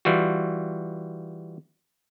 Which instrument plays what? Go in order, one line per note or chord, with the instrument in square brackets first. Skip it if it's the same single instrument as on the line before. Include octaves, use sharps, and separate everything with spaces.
[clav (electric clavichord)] E3 G3 F4 F#4